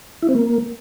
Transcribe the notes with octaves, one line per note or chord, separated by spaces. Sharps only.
E4
C4
A#3